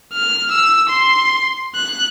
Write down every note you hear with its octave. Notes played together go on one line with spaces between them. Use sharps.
F6
E6
C6
F#6